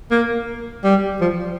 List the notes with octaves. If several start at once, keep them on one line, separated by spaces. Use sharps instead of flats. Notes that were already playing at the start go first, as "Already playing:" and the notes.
A#3
G3
F3